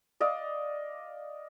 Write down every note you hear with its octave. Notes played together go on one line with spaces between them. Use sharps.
D5 D#5 F5